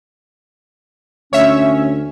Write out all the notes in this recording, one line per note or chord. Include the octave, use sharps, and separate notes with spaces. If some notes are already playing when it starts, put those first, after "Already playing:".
D2 C#4 C#5 E5